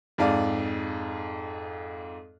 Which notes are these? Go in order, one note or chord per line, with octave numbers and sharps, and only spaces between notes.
F2 G#2 D5 F5